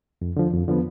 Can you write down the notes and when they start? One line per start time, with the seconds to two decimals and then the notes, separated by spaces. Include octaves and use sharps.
0.21 F2
0.37 D3 F3
0.53 F2
0.68 D3 F3 B3